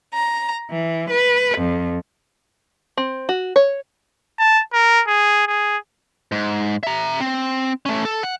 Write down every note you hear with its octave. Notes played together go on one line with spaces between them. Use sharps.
A#5
E3
B4
F2
C4
F#4
C#5
A5
A#4
G#4
G#4
G#2
E5 A#5
C4
A3 C#4
A4
F#5